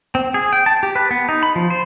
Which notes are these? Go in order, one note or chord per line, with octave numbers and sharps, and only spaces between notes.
C4
G#4
G5
A5
G4
B4
B3
D#4
B5
F3
C5